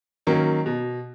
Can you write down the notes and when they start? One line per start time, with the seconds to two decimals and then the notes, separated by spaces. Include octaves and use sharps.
0.27 D#3 F#3 A#3 C#4
0.66 B2